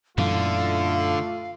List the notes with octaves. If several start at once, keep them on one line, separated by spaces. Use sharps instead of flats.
F#2 A#2 D3 E3 A3 F4 F5